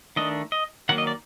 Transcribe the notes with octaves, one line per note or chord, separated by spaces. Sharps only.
D#3 A3 D4 D#5
D#5
D#3 F#3 A#3 F#5
D#5
D5